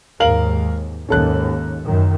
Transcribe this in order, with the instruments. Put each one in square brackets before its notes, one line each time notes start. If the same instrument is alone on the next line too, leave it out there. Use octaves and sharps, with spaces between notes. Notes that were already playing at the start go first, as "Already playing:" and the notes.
[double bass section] D#2 G#2 [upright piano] A#4 F5 F#7
[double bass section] D#2 G#2 [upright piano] C#4 A4 F#6
[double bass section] F#2 A#2 D#3